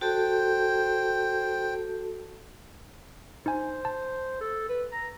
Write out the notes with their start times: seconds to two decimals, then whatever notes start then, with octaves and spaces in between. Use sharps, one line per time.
0.01 F#4 A4 C5 G5 A5
3.46 D#4 C5 G#5
3.85 A5
4.41 A4
4.69 B4
4.92 A#5